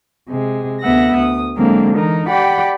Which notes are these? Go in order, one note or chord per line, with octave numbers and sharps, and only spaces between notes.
C3 G#3
D2 B3 E5 F#5 A#6
D2 D#6
D3 F#3 G#3 A#3 C4
E3 D#4 A#4
G4 D5 F#5 G5 B5